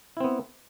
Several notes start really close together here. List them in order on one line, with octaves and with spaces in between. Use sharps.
E4 C4 B3